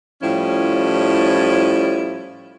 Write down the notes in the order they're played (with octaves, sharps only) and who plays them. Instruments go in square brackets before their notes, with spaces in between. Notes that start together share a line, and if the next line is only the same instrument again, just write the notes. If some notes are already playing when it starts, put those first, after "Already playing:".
[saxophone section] A2 F3 G3 C#4 E4